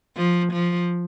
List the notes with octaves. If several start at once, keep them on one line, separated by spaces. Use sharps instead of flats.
F3
F3